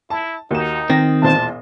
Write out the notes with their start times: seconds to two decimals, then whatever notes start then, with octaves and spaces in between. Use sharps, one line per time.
0.10 E4 A5
0.51 D#2 D#4 F#4 E7
0.90 D#3 C4 G5 D#6 A#6
1.22 E1 A#2 C5 A5